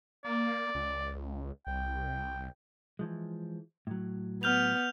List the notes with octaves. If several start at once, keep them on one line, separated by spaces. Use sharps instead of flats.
A#3 D5
C#2
C2 G5
E3 F3 G#3
A2 F#3
B3 F6 G6 F7